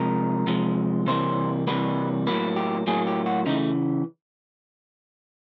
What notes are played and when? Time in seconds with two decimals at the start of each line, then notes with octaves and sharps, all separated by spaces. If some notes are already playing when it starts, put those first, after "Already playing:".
Already playing: C3 F3 G#3 A#4
0.47 C3 F3 G#3
1.07 C3 E3 G3 A#3 C5
1.67 C3 E3 G3 A#3 B4
2.27 A2 F#3 A#3 B4
2.56 G4
2.87 A2 F#3 A#3 G#4
3.07 G4
3.26 F#4
3.46 C#3 E3 A3 D#4